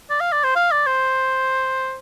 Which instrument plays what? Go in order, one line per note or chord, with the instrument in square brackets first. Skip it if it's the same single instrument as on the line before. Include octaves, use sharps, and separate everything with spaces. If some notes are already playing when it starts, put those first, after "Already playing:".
[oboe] D5
F5
D5
C5
F5
D5
C5